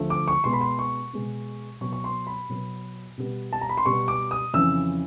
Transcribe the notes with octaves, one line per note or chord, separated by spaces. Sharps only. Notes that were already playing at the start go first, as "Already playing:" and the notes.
Already playing: D2 D3 F3 A3
D6
C#6
B2 G#3 B3 C6
B5
C6
C#6
B2 G#3 B3
B2 F#3 B3 C#6
C#6
C6
B5
B2 F#3 B3
B2 G3 B3
A5
A#5
B5
C6
B2 G3 B3 C#6
D6
D#6
F2 C#3 E3 E6